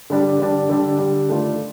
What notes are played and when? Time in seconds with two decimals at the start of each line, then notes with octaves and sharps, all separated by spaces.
0.10 D3 G3 D4
0.39 D3 G3 D4
0.69 D3 G3 D4
0.99 D3 G3 D4
1.28 D#3 A3 D4 F4